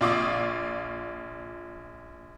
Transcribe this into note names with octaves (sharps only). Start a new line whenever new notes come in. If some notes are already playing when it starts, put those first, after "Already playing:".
A#1 F4 D5 C#6 D#6 E6